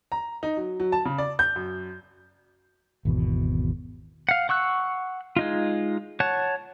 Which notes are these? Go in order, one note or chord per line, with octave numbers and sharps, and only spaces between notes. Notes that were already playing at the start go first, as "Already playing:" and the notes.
A#5
D#4
F#3
F#3
A5
C#3
D5
G6
F#2
G#1 E2 B2
F5 F#5
F#5 C#6 E6 F#6
G#3 D#4 F4
C#5 F#5 A5